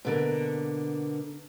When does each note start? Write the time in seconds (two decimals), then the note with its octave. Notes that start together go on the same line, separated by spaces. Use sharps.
0.05 B2 D3 A#3